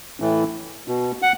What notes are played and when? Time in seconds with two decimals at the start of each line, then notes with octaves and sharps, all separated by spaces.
0.20 A2 E3
0.88 B2
1.22 F#5